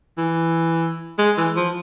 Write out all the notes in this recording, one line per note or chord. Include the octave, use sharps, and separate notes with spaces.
E3
G#3
E3
F3